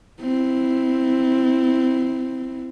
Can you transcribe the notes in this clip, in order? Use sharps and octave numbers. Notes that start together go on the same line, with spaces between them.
C4 E4